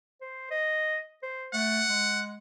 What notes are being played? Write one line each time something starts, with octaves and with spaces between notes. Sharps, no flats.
C5
D#5
C5
A3 F#5
G#3